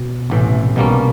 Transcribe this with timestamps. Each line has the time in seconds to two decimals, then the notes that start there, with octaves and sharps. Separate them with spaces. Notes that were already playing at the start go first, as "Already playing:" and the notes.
Already playing: B2
0.30 A1 A2 C3 E3
0.76 B1 B2 G3 A#3 C#4
0.91 C3